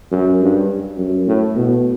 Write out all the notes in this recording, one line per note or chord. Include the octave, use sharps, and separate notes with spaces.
F#2
G2
F#2
A2
B2